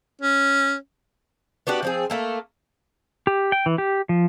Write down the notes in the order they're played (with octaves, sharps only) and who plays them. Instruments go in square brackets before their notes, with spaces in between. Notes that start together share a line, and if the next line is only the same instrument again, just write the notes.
[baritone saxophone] C#4
[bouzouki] B3 D4 F#4 G4
F3 C4 G#4
A3 A#3 A4
[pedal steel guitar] G4
G5
E3
G4
F3